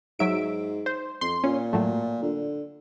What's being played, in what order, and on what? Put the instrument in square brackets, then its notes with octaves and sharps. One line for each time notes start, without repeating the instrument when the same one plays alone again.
[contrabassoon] G#2 [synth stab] F#3 E5 D7
[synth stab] C5
[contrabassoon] F2 [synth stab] C6
[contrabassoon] A#2 [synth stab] C#4
[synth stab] A2 F#3 A3
[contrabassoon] D3